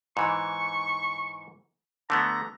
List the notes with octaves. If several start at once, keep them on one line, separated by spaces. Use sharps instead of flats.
G#2 E3 C#6
D3 A3 B3 A#5